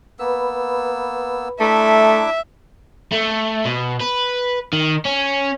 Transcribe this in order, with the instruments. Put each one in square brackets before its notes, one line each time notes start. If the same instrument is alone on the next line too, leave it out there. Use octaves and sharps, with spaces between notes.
[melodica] A#3 B3 E6 [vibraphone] B4 B5
[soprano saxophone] A3 [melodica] D4 E4 D6 [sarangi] E5 [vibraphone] A#5
[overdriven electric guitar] A3
B2
B4
D#3
C#4